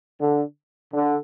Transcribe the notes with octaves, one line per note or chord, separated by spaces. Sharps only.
D3
D3